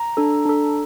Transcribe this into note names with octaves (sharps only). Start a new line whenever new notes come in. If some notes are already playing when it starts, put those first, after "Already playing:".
Already playing: A#5
D4 A4
D4 A4